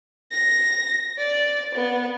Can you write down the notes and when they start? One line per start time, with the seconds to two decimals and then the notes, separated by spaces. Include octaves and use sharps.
0.31 A#6
1.18 D5
1.75 B3